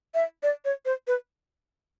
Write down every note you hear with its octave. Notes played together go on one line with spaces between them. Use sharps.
E5
D5
C#5
C5
B4